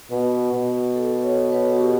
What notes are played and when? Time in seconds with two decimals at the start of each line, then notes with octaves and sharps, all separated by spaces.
0.10 B2 B4
0.53 B2
0.95 A4
1.23 C#5
1.52 B4
1.73 F#4
1.80 G4